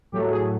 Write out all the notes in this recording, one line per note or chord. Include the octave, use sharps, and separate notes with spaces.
A2 F#3 A3 G4
G#4